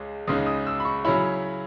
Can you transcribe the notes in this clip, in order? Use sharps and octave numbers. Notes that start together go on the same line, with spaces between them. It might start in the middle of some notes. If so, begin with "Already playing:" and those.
Already playing: C#2 C#3 G#3 C#4
C#2 C#3 G#3 D#4 D#6
D#6
E6
B5
C#6
C#3 F#3 C#4 E4 B5